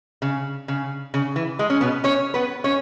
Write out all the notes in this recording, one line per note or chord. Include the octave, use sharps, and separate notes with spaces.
C#3
C#3
C#3
E3
G#3
C#4
B2 B3
C#4 C#5
B3 B4
C#4 C#5